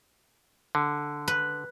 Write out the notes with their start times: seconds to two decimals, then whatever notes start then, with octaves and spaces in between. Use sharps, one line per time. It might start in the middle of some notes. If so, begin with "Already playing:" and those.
0.75 D3
1.28 B4